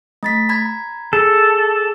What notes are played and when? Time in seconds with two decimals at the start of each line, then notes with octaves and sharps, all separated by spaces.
0.23 A3 A6 B6
0.49 A#5 B5 G#6
1.13 G#4 A4